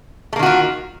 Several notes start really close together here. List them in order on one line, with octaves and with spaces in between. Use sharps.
A3 A#3 D#3 F#4 F4